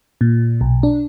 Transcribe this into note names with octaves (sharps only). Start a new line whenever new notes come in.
A#2
B1
D4